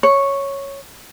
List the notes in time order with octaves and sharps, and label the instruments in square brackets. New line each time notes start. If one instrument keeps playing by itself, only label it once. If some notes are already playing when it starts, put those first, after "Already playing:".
[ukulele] C#5